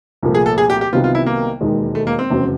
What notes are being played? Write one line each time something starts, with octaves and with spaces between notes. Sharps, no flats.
C2 A#2 F3 A3
G#4
A4
G#4
G4
G4
C2 C3 D#3 F#3 B3 F4
F4
E4
A#3
E1 D#2 D#3 G#3
A3
A#3
C4
F1 E2 C#3 F#3